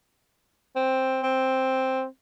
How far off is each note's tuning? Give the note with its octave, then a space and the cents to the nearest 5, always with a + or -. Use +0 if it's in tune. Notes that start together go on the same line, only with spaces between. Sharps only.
C4 +5
C4 +5